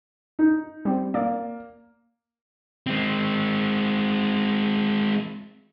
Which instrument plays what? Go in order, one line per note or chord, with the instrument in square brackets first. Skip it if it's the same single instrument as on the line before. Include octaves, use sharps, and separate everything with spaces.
[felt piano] D#4
[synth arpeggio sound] G3 C4
[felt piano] A#3 [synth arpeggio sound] D5
[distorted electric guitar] G#3 C4